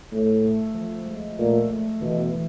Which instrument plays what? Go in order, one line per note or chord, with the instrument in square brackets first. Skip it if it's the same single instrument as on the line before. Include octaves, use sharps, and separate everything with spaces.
[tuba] A2 [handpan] A3
[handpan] A3
F3
G#3
[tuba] A#2 [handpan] A3
[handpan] A3
[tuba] B2 [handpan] E3
[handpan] E3